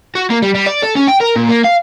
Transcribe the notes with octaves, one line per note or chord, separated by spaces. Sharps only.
F#4
A#3
G3
G3
D5
A4
C#4
G5
A#4
A#2
A#3
F5